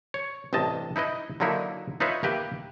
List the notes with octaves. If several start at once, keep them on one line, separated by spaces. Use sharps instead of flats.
C#5
A1 G2 C3 D#5 A5
D#4 E4 B4 D#5
D3 F#3 A#3 D#4 E4
D#4 F4 B4 C#5 E5
A#3 G4 B4 E5